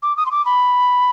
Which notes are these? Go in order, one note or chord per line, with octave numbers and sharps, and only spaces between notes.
D6
D#6
C6
D6
B5